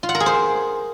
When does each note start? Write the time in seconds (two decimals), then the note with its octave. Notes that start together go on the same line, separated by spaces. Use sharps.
0.03 F4
0.09 F#5
0.15 A#4
0.20 G#4
0.26 C5